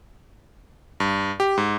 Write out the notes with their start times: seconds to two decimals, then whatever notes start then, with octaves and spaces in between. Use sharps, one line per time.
1.00 G2
1.40 G4
1.58 G#2